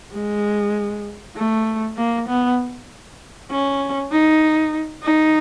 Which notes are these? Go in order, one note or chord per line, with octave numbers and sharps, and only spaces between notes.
G#3
A3
A#3
B3
C#4
D#4
D#4